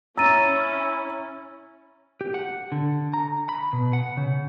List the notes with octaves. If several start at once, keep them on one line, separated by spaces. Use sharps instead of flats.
C#4 E4 A#5 E6 A6 D#7
G4
F#5
D3
A#5
B5
B2
F#5
C#3